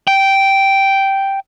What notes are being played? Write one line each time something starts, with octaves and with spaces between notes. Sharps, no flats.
G5